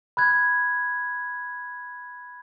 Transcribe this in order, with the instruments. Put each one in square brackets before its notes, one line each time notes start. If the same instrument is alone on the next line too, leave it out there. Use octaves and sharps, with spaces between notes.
[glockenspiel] B5 F#6 G#6